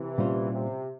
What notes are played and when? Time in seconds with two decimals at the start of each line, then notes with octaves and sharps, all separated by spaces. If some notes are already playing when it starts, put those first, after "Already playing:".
Already playing: C3 E3
0.18 A#2 G3 C#4 F4 C5
0.53 C3